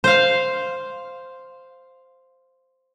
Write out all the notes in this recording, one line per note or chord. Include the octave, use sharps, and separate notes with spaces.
C5 F5